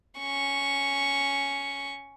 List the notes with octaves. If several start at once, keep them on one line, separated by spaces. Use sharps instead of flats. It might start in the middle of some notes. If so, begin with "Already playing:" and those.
C#4 C#6